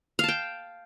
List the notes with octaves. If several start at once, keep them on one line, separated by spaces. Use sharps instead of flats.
F5 G5 A5